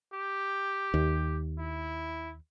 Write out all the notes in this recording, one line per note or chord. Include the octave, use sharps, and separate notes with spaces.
G4
D#2
E4